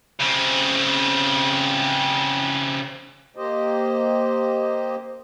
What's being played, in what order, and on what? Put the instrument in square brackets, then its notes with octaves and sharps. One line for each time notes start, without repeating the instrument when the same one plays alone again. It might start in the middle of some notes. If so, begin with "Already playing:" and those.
[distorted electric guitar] C#3 C4
[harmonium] A#3 G4 C5 D#5